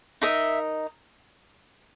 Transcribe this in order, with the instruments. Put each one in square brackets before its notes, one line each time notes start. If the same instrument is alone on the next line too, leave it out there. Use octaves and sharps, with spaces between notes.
[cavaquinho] D#4 A#4 D#5 E5